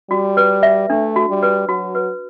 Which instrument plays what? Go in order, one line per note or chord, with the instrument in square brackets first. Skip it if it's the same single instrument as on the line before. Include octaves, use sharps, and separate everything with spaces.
[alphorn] G3 [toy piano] F#4
[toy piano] B4
E5
[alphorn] A3 [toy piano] D4
[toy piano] F#4
[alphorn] G3
[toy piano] B4
[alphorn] F#3 [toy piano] F#4
[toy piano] B4